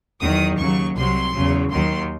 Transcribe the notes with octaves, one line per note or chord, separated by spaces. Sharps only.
E2 D#3 F#3 D#6
D#2 C#3 F#3 C#6
C2 C3 F#3 C6
E2 C#3 F#3
D#2 D#3 F#3 C6